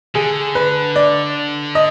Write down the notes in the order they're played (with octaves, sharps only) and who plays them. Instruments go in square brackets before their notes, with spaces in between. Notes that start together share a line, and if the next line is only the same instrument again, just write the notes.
[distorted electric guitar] D3 [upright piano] G#4
[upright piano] B4
D5
D#5